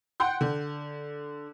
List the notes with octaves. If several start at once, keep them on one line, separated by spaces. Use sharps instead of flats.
F#5 G5 C6 G6
D3